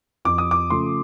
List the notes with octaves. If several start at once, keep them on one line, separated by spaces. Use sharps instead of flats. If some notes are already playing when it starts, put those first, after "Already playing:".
F2 D6
D#6
D6
C#3 F3 A3 C6